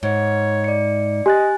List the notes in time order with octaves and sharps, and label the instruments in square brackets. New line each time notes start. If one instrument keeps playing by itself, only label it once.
[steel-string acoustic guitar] G#2 [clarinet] C#5
[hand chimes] D5 C#7
[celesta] G4 [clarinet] D#5 [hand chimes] G#5 F#6 A6